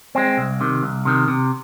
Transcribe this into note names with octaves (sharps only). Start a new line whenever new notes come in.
G#3 C4
C2
C3 D#3
C2
C3 D#3
C3